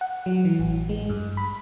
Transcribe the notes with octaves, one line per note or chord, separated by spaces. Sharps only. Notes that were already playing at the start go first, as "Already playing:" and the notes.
F#5
F#3
E3
A1
G#3
G2
B5